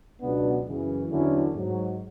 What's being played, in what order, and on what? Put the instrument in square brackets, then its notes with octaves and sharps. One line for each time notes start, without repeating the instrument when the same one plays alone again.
[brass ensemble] C#2 B2 F#3 B3 D4
F#2 C#3 E3
E2 D3 F#3 C#4 E4
G#2 F#3